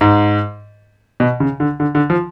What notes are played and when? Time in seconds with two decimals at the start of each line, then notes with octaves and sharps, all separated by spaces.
0.01 G#2
1.20 B2
1.40 C#3
1.60 D3
1.80 D3
1.95 D3
2.10 F3